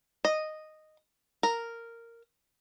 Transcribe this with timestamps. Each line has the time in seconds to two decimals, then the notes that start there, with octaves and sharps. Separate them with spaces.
0.25 D#5
1.43 A#4